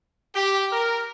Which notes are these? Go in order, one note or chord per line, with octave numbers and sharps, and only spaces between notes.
G4
A#4